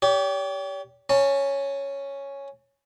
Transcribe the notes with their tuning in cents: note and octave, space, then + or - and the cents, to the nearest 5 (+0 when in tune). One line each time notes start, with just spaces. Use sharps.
G4 +0 C#5 +45
C#4 +0 A5 +35